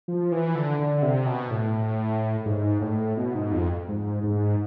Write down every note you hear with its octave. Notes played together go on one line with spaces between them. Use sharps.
F3
E3
D3
D3
C3
B2
A2
G#2
A2
B2
G#2
F2
G#2
G#2